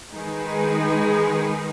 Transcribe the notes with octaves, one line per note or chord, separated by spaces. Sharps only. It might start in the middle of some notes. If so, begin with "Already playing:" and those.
D#3 G#3 D#4 G#4 B4